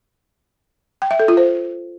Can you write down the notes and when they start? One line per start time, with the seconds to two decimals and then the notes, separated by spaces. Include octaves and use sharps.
1.02 G5
1.11 E5
1.19 A4
1.28 F4
1.37 C5